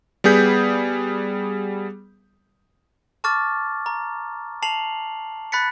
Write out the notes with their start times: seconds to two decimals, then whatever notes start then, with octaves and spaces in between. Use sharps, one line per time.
0.24 G3 B3 G#4 G6 B6
3.24 A5 C#6 D6 F6 A6
3.86 A#5
4.62 A5 C7 F7 F#7
5.52 B5 F#6 A6 B6 C#7